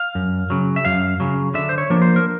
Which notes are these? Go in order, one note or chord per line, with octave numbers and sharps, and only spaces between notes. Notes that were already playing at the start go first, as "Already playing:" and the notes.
Already playing: F5
F#2
C#3 F#3
E5
F#2 F5
C#3 F#3
D3 E5
C5
C#5
F3 A#3 D4
C5
A#4